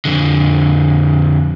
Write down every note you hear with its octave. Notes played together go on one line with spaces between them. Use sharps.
F2 D3